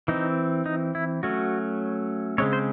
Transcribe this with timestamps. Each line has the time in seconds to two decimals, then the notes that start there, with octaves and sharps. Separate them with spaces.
0.08 E3 C4 D#4
0.66 D#4
0.95 E4
1.23 F#3 A3 C#4 F#4
2.38 C#3 G#3 C4 C#5
2.53 C5